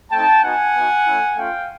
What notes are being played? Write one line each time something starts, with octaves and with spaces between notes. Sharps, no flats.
A3 C4 D#4 G5 A5
B3 D#4 F#4 F#5 G#5
B3 D#4 F#4
A3 C#4 E4
A3 C#4 F4 F5 G5